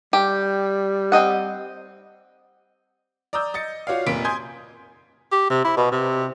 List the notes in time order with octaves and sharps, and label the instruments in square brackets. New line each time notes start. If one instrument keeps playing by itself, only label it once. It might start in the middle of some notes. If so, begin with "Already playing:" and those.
[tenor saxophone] G3 [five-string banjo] G4
[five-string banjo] C4 D#5 F#5
[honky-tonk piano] D5 A#5 D#6 E6 G6
D#5 A6 C#7
F4 F#4 C#5 D5 F5
F1 A#2 B6 D7
G#5 C6 D#6 G6 G#6
[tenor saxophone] G4
C3
E4
B2
C3